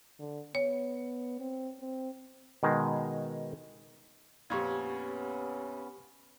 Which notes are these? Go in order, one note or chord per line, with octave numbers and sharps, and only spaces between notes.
D3
B3 C#5
C4
C4
B2 D#3 G#3
F2 A#2 B3 C#4 G4 C#6 G#6